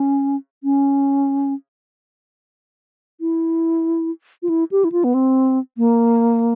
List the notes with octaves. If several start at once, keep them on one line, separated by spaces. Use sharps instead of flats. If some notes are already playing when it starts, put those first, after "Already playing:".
Already playing: C#4
C#4
E4
F4
E4
G4
E4
F4
B3
C4
A#3